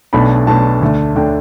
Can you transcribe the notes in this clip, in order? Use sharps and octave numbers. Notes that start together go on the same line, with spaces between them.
B1 B2 A3 D4 B5
B1 B2 A3 D4 A5
D2 D3 A3 D4
D2 D3 A3 D4 G5